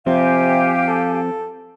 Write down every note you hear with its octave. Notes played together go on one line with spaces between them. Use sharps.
C3 F3 C4 G4 F5 G#5
A4